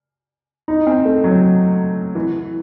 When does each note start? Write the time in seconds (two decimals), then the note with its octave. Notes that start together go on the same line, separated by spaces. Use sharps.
0.68 D#4
0.87 C4
1.05 A3
1.24 F#3
2.15 E3